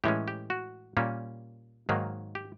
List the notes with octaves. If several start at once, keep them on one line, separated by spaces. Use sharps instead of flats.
A2 E3 G#3 C#4 G4
G4
F#4
A#2 G3 A#3 C#4
G#2 D#3 F#3 A#3
G4